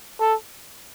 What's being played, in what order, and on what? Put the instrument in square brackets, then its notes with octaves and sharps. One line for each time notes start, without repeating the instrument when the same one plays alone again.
[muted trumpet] A4